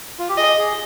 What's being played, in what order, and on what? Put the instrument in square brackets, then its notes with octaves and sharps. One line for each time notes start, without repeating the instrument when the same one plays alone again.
[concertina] F4
G4
[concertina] G#4 [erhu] D#5
[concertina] G#4